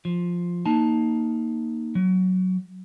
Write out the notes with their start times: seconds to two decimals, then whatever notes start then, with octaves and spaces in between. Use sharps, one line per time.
0.05 F3
0.66 A#3 D#4 A5
1.95 F#3